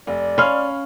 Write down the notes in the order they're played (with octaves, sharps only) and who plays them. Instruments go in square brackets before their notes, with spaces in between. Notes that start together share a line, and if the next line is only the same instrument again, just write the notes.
[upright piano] F1 [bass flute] D5
[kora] C#4 F5 [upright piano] B5 C6 F6